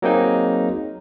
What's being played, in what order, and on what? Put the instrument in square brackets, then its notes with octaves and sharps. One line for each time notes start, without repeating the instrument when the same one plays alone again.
[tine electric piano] F#3 A#3 C4 D#4 G#4